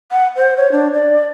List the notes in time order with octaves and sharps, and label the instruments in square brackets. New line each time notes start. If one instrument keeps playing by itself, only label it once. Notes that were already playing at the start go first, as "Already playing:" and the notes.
[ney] F#5
C5
C#5
D4
D5